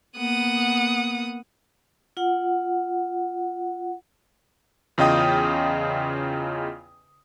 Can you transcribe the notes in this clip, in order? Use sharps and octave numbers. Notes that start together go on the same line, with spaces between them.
A#3 B3 F#5 D#6
F4 F#5
E2 C#3 F4 D#5 G5 D#6